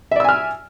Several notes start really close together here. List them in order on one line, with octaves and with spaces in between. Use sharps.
E5 D5 E6 G#5 F6